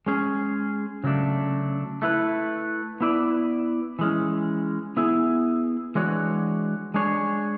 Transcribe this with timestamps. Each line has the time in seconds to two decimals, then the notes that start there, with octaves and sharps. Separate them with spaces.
0.06 G#3 C#4 G#4
1.04 C#3 F#3 A3 D4
2.02 A3 E4 B4
3.01 B3 E4 B4 D5
3.99 E3 G#3 C#4
4.97 B3 E4 G#4
5.95 E3 G#3 D4 F#4 C#5
6.94 G#3 D4 G#4 C#5